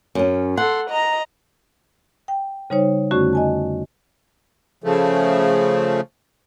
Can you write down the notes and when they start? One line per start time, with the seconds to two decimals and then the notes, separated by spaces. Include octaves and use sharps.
0.15 F#2 C#4
0.57 A4 F#5 C6
0.90 D#5 A#5
2.28 G5
2.70 C#3 G3 D#4 C5 C#5
3.11 F2 D3 A3 C#4 F#4 C#6
3.33 D#5 G#5 A5
4.84 C#3 F3 A3